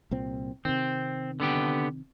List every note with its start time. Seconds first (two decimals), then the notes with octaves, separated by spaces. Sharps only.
0.11 C2 A#2 C4
0.65 C3 D#3 C4
1.40 D3 B3 G4